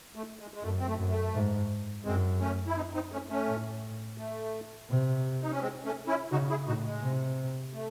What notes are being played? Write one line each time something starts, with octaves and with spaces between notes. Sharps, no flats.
A3
G#3
G#3
F#2 A3
C4
A3
F#2
A3
G#2
F#2 G#3 C4
A3 C#4
E4
C4 D#4
C4 D#4
A3 C#4
A3 C#4
A2
A3
C3
D#4
C#4
G#3 C4
A3 C#4
C#4 E4
C#3 D#4 F#4
E4 G#4
A2 D#4 F#4
G#3
C3
A3